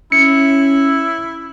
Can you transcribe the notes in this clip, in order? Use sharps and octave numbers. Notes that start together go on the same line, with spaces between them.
C#4 E4 C#7